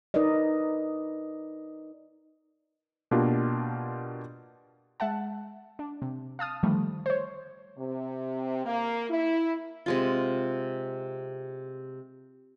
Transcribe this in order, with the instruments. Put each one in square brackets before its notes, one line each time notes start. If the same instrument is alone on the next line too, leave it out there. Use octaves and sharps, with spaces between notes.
[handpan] D#4 A#4 B4 D5 D#5
[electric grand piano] B2 A#3 D4 F4 G4
[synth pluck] G#3 E5 F#5 A5
D4
C3
F5 A5 D#6 F6
D3 D#3 F3 G3 A3
C5 C#5
[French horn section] C3
A#3
E4
[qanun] C3 G#3 F4